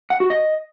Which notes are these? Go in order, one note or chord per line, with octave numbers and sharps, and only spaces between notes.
F#5
F#4
D#5